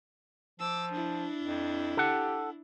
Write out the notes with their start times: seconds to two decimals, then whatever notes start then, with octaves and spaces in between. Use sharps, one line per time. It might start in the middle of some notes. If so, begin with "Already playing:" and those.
0.60 F3 D6 E6
0.91 D4 E4
1.43 F2
1.97 G4 A4 F#5